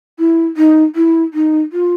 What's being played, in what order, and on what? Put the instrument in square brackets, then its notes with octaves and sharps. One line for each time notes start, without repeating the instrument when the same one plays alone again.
[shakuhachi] E4
D#4
E4
D#4
F4